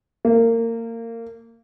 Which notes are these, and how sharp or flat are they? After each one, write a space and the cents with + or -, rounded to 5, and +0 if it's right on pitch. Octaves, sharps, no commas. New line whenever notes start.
A#3 -25